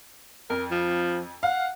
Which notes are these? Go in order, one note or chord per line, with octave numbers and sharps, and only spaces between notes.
F2 A#4
F3
F5 F#5